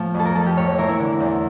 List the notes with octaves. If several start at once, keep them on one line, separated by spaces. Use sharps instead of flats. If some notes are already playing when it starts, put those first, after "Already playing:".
Already playing: A2 F3
F2
A4
A#4
F2 A4
G4
A2 C#5
C#5
E3 A#4
E4
D3
E2